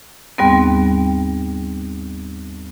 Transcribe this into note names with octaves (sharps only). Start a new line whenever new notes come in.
D#2 G#2 G3 B3 C4